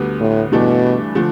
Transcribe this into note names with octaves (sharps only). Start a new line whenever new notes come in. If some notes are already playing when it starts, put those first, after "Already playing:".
Already playing: D2 D3 G3 B3
A2
G2 B2 E3 A3 D4
D3 F3 A3